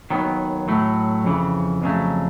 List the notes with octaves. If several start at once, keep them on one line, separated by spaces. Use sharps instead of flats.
D#2 D#3 F#3 B3
A2 F#3 A3
F2 C#3 E3
F2 C#3 F#3 A3